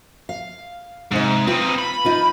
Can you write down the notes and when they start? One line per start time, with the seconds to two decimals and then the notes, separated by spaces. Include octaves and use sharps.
0.29 F5
1.12 G#2 C3 D#4
1.47 C4 D#4 F4 B4
1.78 B5
2.05 D#4 F4 B4